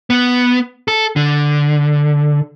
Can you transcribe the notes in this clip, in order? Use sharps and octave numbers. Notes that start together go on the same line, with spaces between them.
B3
A4
D3